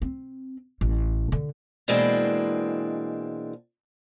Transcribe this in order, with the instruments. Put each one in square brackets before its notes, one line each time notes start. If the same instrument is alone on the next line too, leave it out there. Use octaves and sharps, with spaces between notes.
[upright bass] C4
A1
D3
[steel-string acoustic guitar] B2 E3 G#3 A#3 C4 D4